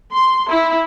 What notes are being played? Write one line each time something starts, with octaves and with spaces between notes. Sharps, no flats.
C6
E4